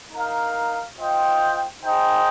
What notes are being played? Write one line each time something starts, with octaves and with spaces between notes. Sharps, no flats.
D#4 A#4 F5
F4 C5 D#5 G5
D#4 G#4 C5 D#5 G5